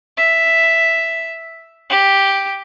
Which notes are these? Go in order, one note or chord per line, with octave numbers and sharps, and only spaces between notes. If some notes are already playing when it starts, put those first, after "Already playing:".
E5
G4